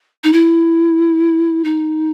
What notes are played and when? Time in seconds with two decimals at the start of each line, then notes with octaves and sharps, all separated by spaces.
0.24 D#4
0.33 E4
1.64 D#4